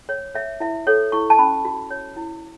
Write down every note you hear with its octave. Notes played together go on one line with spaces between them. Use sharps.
C#5
C#5 E5
E4 E5
A4 C#5
E4 C#6
A5
C#4 B5
F#4
C#5
E4